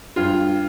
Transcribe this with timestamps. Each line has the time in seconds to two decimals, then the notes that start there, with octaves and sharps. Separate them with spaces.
0.16 G2 F4